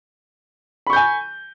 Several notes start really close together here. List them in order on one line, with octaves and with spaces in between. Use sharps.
B5 C#6 G6 G#5